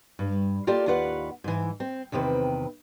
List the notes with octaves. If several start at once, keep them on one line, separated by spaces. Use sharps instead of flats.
G2
A#3 F4 G4 A4 D5
D#2 F4 B4 F#5
G#2 E3
C4
E2 C3 D#3 C4 B4